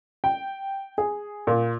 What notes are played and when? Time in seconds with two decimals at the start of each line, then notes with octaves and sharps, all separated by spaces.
0.24 G5
0.98 G#4
1.47 A#2